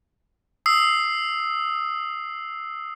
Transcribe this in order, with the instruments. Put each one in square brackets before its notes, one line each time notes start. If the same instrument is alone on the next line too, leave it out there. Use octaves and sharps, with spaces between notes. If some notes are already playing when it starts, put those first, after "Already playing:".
[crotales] D#6 E6 C7